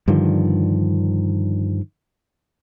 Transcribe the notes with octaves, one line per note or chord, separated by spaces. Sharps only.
G2 D3 D#3 F3